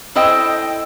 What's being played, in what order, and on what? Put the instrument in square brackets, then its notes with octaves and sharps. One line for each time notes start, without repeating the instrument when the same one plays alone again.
[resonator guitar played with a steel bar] E4 A4 C5 D#5 G5